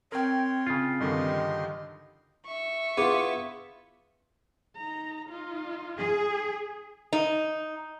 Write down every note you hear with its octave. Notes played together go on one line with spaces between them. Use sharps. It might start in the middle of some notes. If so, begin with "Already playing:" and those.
C4 A#4 C#5 G5 C6
C#3 F4
G2 D3 D#3 G4 D#5 C6
E5 C#6
B3 E4 F4 G#4
D#4 A#5
D#4 F4
G#4
D#4